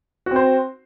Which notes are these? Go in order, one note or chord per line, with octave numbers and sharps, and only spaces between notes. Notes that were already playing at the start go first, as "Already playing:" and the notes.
C4 F#4 C5